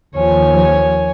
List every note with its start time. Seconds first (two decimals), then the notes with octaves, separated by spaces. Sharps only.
0.15 D#2 F3 C#5 G#5